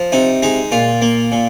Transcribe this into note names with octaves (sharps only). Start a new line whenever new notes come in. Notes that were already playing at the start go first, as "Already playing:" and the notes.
Already playing: F3
C3 D#4
G#3 D#4
A#2 F4
A#3
A#2